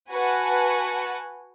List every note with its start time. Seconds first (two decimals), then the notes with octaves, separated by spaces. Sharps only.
0.11 F#4 B4 F#5 G#5 A5